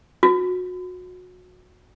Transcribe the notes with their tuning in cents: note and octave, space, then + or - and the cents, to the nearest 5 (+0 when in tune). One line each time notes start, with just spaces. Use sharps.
F#4 -25